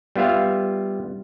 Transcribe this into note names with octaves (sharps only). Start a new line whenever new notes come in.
G3 B3 F4 E5 F5